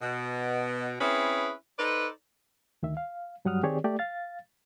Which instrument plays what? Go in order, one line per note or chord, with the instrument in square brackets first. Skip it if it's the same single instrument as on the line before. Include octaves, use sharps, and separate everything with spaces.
[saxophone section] B2
C4 C#4 E4 G#4 B4
D#4 A4 B4 C5 D5
[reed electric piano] D2 D#3 E5
F5
G2 F#3 G3 F#5 D#6 F6
D#3 C4 G4 G#4 C#5 D5
A3 G4 D5
F5 A6